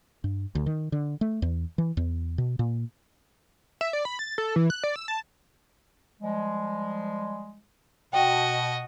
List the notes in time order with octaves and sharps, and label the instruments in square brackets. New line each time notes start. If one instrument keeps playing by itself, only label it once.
[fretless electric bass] G2
D2
D#3
D3
A3
E2
E3
E2
B2
A#2
[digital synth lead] E5
D5
B5
A6
A4
E3
F#6
D5
E6
A5
[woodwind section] F3 G3 G#3
[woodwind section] B2 [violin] F#4 D#5 [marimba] G5